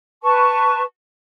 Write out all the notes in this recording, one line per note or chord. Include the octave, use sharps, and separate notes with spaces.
B4 A5 C#6